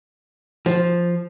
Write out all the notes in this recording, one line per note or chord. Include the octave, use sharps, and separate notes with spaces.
F3